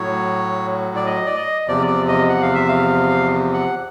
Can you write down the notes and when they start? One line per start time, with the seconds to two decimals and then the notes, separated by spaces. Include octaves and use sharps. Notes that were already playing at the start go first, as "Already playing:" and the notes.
Already playing: A2 F#3 C#5
0.96 D5
1.06 D#5
1.26 D5
1.36 D#5
1.68 E2 C3 F3 D5
1.88 D5
2.08 D#5
2.29 F#5
2.42 F5
2.55 E5
2.68 F5
3.53 F#5